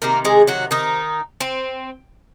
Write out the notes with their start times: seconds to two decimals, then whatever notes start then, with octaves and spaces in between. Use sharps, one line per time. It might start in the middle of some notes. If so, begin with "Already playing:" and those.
0.02 C3 D#3 A#3 A#4
0.25 G#3 G#4
0.47 F#3 F#4
0.71 D#3 D#4
1.40 C4